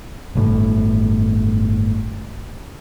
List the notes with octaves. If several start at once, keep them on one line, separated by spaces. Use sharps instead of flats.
G1 A2